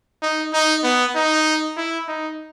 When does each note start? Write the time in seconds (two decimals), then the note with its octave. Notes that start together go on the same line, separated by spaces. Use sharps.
0.22 D#4
0.53 D#4
0.83 B3
1.15 D#4
1.77 E4
2.08 D#4